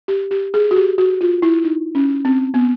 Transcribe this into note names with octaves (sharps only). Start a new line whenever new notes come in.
G4
G4
G#4
F#4
G4
F#4
F4
E4
D#4
C#4
C4
B3